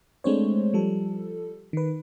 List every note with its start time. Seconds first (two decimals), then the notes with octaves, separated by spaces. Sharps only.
0.24 G#3 A3 C4 D4 C5 C#5
0.74 F3 G3 A4
1.73 D#3 B4